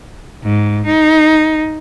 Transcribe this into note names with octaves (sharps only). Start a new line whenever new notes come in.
G#2
D#4